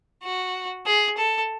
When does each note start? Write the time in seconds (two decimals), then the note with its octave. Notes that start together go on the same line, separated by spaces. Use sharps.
0.23 F#4
0.86 G#4
1.17 A4